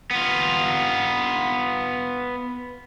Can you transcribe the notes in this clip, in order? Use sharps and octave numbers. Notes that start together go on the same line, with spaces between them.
B3 F4